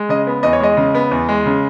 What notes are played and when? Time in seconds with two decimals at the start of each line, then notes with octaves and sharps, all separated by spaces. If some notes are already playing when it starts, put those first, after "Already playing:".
Already playing: G#3
0.09 C#3 D#5
0.27 B3
0.43 E2 D#5
0.53 C#5
0.60 G#3 D#5
0.77 C#3
0.95 B3
1.11 E2
1.29 G#3
1.46 C#3